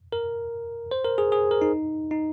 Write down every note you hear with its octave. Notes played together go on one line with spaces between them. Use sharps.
A#4
C5
A#4
G#4
G#4
A#4
D#4
D#4